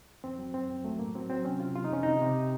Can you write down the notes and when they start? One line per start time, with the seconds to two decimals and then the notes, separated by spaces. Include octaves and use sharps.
0.24 F2 C4
0.39 F#3
0.54 F#2 C4
0.70 F#2
0.84 F#3 A3
0.99 A2 A#3
1.15 F#3 C4
1.30 F#3 C4
1.45 C3 C#4
1.60 C3 F4
1.75 C3 F4
1.84 D#4
1.90 F2 C#4
2.03 C3 D#4
2.21 C3